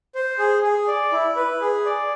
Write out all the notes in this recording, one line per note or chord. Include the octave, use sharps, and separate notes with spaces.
C5
G#4
G#4
D5
E4
B4
G#4
D5